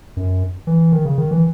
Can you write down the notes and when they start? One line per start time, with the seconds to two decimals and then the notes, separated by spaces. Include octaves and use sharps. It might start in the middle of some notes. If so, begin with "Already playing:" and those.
0.17 F#2
0.67 E3
0.92 D#3
1.05 C#3
1.18 D#3
1.31 E3